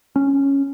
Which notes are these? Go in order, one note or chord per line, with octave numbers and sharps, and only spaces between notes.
C#4